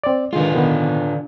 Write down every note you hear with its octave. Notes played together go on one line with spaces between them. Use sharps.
C4 D5
D3 D#3 G#3 F4
B2 D#3 B3